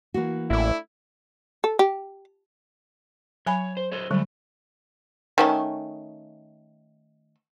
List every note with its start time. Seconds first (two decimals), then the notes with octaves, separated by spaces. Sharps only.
0.14 E3 A#3 F#4
0.51 A1 A3 D4 E4
1.64 A4
1.79 G4
3.47 F#3 C#5 G#5 B5
3.77 C5
3.92 A4 C5 C#5
4.11 D3 F#3 G3 A3
5.38 D#3 A3 C#4